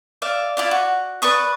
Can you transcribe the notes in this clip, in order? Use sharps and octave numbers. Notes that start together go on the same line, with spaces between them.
D5 E5 F5
E4 F4 D5
F#4
B4 D5 C#6 D#6